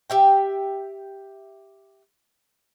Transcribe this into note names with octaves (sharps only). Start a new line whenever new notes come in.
G4 E5 G5